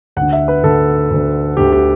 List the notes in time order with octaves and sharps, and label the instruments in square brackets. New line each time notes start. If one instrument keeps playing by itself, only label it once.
[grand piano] D2 D3 F#5
E5
B4
D2 D3 A4
D2 D3
D2 D3 G4
G4